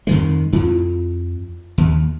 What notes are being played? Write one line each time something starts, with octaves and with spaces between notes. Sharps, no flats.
F2 D#3 G#3
F2 E4 F4
D#2